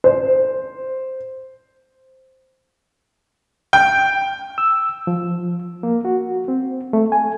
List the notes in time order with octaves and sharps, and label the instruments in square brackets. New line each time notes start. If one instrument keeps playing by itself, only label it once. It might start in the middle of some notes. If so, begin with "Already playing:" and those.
[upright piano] C5
G5
[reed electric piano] E6
F3
A#3
F#4
C4
A3
G#5